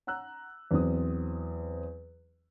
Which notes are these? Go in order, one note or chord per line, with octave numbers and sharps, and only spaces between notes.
F#5 A#5 E6 F#6
E2 F#3 C4 D#6